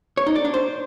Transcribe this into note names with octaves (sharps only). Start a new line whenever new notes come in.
C#5
D#4
D5
D4
C5